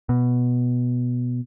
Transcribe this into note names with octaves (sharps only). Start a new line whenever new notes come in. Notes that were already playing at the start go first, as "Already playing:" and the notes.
B2